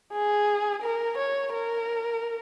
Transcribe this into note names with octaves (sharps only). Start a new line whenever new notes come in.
G#4
A#4
C#5
A#4